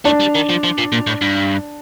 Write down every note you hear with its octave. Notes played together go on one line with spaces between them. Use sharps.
A3 D4
G3
D#3
F3
F3
A#2
A#2
A2
G2